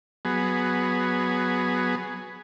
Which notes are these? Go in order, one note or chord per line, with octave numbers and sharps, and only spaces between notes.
F#3 B3 G#4